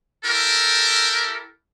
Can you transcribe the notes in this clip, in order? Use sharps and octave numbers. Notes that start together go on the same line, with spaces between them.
E4 G4 A4 A#4